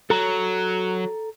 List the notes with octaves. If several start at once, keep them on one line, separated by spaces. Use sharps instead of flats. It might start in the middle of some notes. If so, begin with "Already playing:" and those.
F#3 A4 A#5